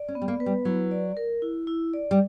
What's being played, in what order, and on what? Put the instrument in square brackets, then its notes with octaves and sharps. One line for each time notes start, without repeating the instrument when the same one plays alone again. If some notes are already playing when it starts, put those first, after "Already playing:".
Already playing: [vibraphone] D5
[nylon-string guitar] C#4
[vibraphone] B3
[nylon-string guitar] G3
A#3
[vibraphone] B4
[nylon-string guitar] G3
[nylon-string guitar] F#3 [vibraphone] E4
[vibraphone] D5
A#4
E4
E4
D5
[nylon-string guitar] G3